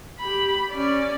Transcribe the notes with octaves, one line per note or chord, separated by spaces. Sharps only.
G4 B5
C#4 D5